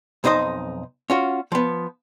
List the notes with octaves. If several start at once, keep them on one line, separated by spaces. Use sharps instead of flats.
B1 F2 D#4 C5 D#5
C#4 F4 F#4
F3 B3